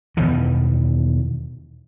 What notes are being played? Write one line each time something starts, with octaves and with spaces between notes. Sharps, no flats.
E2 B2 D#3 E3